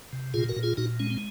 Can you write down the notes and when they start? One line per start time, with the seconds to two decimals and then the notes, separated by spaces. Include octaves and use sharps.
0.13 C3
0.34 A#2 F4 G#4
0.49 F#4 A#4
0.56 A#2
0.63 F4 G#4
0.77 A#2 D#4 F#4
1.00 G#3 C#4
1.10 C4